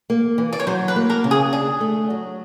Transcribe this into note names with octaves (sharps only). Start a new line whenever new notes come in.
A#3
E3
D5
C#5
F#3 C5
B4
A#3
A#4
C#3
G#4
D4 G#4
A3
F#3